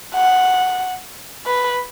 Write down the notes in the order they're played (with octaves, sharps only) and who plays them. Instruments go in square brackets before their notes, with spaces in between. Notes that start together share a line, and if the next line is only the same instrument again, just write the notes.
[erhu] F#5
B4